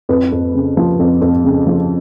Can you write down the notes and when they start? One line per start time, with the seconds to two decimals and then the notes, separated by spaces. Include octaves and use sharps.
0.09 F2 B4
0.32 F2
0.54 C#3
0.77 F3
1.00 F2
1.22 F2
1.44 C#3
1.67 F3